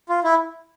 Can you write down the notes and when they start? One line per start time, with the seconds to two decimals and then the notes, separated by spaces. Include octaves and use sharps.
0.09 F4
0.24 E4